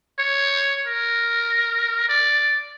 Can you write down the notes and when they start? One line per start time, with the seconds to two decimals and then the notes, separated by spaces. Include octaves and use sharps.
0.19 C#5
0.87 A#4
2.08 D5